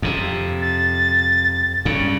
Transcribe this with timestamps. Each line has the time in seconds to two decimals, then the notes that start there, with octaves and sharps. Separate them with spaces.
0.02 F2 C3
0.61 A6
1.85 G2 C#3